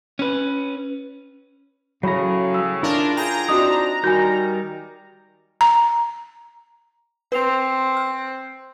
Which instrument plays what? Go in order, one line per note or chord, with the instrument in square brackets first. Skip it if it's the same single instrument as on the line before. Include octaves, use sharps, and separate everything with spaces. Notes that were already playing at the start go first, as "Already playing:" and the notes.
[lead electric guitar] C#4 B4
[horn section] A2 C#3 [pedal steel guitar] F#3 A#5 [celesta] C#5 B5
[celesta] E6
[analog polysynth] D4 A#4 [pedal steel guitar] E4 F4
[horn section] G#4 G5 [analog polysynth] A#5
[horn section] C4 D4 D#4 [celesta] F#4 D#6
[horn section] D#3 G3 [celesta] F#4 G#5 [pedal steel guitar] G6
[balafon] A#5
[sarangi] C4 [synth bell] B4 C7 F7
[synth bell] F6